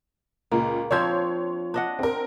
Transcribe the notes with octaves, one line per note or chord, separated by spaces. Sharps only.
C#2 A#2 A#3
F3 C4 D4 C#5 C6 G#6
D4 D#5 F#5
C4 A#4